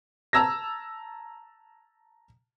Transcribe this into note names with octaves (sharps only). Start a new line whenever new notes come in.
A5 A#5 E6 G#6 A#6